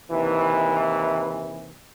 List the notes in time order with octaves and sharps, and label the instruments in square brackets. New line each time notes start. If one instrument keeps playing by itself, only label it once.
[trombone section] D#2 C3 E3